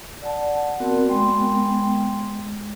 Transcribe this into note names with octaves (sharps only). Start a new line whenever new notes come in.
D5 F#5 A5
B3 C4 F#4 A#4
G#3 B3 G5 C6
G#3